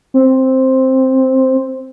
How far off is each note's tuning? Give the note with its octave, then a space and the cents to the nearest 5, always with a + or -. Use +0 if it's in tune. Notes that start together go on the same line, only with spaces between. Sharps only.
C4 +5